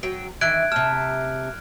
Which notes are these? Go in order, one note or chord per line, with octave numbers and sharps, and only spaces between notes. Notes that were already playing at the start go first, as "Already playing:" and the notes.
F#3 G5
D#3 E3 F#6 G#6 D7
C3 A5 F6